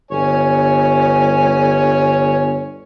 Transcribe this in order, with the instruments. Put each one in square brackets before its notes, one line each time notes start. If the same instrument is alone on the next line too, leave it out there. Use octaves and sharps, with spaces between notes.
[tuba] G1 [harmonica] C#5 G#5